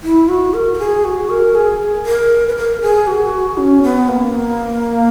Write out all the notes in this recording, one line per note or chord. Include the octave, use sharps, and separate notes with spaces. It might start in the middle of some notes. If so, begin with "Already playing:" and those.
E4
F#4
A#4
A#4
G#4
F#4
A#4
G#4
A#4
B4
A#4
G#4
F#4
C#4
B3
A#3